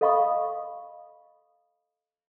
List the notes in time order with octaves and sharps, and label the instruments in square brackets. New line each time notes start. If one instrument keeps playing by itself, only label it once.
[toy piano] A4 D#5 F5 B5 C#6 D#6